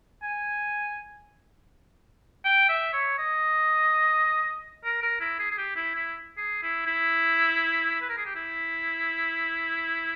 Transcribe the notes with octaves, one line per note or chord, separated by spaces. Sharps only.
G#5
G5
E5
C#5
D#5
A#4
A#4
E4
G#4
G#4
G4
E4
E4
G#4
E4
E4
B4
A#4
G#4
G4
E4